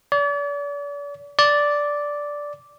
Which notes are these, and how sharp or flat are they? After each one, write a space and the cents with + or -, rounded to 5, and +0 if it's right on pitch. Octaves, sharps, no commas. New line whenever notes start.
D5 -40
D5 -5